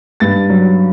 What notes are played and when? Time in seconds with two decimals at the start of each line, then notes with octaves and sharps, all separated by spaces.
0.20 G2 A6
0.49 F#3